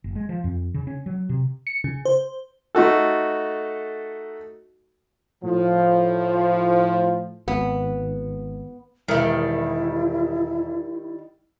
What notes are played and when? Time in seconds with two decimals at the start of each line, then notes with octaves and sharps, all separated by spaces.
0.04 F#1
0.15 G#3
0.29 F3
0.44 F2
0.74 C#3
0.87 C#4
1.06 F#3
1.29 C3
1.67 C#7
1.84 C#3
2.05 C5
2.75 A3 D#4 F#4 A4
5.44 A2 F3
7.48 G#1 B3
9.08 E1 D#3 G3 E4 A#4 E5